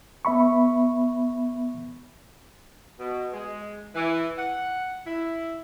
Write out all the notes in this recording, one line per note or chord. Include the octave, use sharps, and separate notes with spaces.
B3 E5 B5 C#6
B2
G#3
E3
F#5
E4